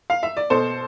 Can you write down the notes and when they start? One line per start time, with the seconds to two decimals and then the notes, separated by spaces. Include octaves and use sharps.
0.10 F5
0.23 E5
0.37 D5
0.50 B2 A4 C5